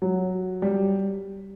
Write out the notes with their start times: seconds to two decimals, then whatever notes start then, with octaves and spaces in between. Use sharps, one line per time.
0.02 F#3
0.62 G3